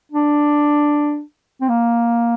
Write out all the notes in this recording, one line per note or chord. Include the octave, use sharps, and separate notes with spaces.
D4
C4
A#3